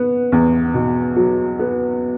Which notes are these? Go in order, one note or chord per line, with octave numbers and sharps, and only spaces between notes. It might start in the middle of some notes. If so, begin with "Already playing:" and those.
Already playing: B3
E2
B2
F#3
B3